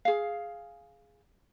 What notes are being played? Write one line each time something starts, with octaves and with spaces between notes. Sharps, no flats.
G#4 F5